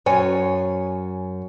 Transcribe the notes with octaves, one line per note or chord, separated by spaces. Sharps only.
F#2 C#5 G#5